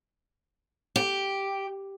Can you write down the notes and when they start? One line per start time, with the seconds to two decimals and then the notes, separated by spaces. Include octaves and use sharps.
0.96 G4